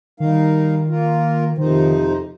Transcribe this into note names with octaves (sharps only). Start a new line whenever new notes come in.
D#3 G3 D#4 A#4 F5
A#3 F4 A#4
F2 C3 D#3 F3 D#4 C5